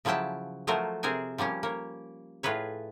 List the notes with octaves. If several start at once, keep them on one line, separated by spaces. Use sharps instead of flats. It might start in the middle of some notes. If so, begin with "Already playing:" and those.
C#3 F3 F#3 E4 G5 A5
F3 F#3 A3 F4 A#4 C5
C3 C4 G#4 A#4 C5 G#5
F3 G3 A#3 C#4
A#3 C#5
A2 F4 G#4 B4 C#5